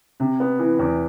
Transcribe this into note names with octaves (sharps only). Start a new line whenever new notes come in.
C3
B3
E3
E2